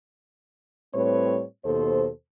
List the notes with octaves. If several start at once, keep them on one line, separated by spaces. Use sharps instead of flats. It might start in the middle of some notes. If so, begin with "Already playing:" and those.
A2 G3 C4 B4 C#5
D#2 B2 A4 C5